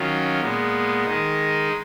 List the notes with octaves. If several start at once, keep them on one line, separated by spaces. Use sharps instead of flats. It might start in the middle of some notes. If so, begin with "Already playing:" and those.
Already playing: D#3 F#3 C#4 F4
A#2 G#3 B3
D#3 G#3 D#4